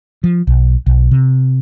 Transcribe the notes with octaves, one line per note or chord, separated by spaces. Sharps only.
F3
B1
B1
C3